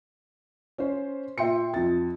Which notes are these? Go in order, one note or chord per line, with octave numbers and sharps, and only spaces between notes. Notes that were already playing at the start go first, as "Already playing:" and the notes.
C#4 C5
A#2 E5 G5 C6 C#7
F2 A6